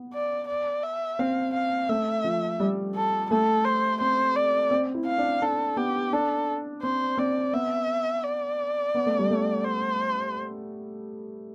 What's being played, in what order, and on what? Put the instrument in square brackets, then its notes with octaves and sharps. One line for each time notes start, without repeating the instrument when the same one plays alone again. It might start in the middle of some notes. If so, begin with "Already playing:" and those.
Already playing: [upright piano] B3
[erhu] D5
D5
E5
[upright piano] C4 [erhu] F5
[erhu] F5
[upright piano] A3 [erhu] E5
[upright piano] F3
G3
[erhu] A4
[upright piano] A3 [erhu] A4
[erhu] C5
[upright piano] C4 [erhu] C5
[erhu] D5
[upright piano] C4
E4
[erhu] F5
[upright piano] D4
[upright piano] D4 [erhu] A4
[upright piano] B3 [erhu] G4
[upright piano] D4 [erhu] A4
[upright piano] C4 [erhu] C5
[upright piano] C4 [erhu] D5
[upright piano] B3 [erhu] E5
[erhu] D5
[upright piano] B3
A3
G3
A3
[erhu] C5